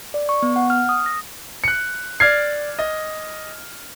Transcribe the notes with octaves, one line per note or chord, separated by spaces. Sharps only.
D5
C#6
B3
F#5
F6
D#6
A#6
F#6 C#7
D5 F6 G#6 C7
D#5